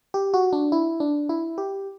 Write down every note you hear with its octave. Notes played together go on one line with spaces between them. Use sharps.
G4
F#4
D4
E4
D4
E4
G4